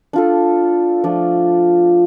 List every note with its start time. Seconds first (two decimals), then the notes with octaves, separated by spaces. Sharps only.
0.13 D4 F4 A4
1.04 F3 A3 D4